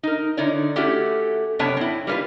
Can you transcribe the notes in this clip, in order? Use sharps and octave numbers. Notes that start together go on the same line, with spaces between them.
D#4 A#4
D3 D#4 E4 C#5 D5
A3 C#4 E4 F#4 G4 A4
F#2 C3 B3 D4 C#5 A5
C4 E4
G3 A#3 C#4 F4 B4